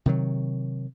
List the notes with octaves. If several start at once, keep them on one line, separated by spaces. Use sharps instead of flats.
C3 D#3 F#3